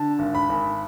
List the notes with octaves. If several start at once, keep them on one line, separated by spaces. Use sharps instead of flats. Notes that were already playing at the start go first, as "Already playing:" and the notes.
Already playing: D3 A5
G#1
B5
G#1